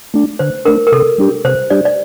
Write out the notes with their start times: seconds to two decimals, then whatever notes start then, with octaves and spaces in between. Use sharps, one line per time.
0.14 A3 D4
0.39 D3 C5
0.65 A3 D4 A#4
0.87 A#4
0.92 C3 A4
1.18 G3 D4 G4
1.45 C3 C5
1.70 G3 D4 G4 D5
1.85 D5